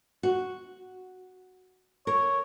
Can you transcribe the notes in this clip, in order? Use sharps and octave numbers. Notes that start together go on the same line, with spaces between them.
F#4
A#4 C#5